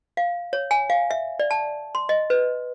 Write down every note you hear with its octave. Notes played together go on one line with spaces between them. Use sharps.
F5
C#5
G#5
F5
E5
D5
A5
C6
D#5
B4